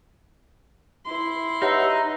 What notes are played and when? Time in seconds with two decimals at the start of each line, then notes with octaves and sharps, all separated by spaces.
1.05 E4 C6
1.62 D#4 G4 B4 C#5 E5 F#5